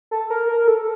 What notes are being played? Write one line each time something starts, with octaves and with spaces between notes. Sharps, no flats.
A4
A#4
A#4
A4